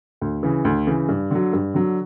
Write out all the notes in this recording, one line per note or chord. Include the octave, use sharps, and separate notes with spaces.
D2
C#3 E3
D2
C#3 E3
G2
D3 F#3
G2
D3 F#3